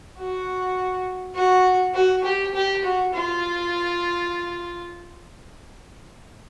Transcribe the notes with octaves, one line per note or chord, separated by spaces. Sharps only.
F#4
F#4
F#4
G4
G4
F#4
F4